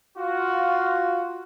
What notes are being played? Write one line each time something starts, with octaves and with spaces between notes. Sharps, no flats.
F4 F#4